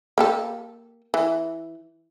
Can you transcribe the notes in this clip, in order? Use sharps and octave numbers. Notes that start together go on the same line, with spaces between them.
A#3 G4 A4
E3